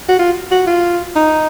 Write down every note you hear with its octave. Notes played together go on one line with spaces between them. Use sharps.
F#4
F4
F#4
F4
D#4